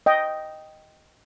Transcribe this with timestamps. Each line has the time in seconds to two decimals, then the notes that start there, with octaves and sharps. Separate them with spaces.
0.06 D#5 G5